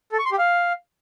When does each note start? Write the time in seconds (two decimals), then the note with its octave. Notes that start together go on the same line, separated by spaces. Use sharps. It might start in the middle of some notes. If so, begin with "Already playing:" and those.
0.12 A4
0.19 C#6
0.25 C6
0.32 G4
0.38 F5